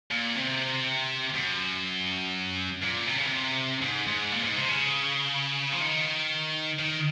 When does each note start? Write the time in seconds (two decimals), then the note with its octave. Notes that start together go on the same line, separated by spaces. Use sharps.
0.11 A#2
0.36 C3
1.35 F#2
2.83 A#2
3.07 C3
3.18 C#3
3.27 C3
3.82 G#2
4.07 G#2
4.31 A#2
4.44 G#2
4.57 C3
4.69 C#3
5.72 F3
5.80 D#3
6.79 D#3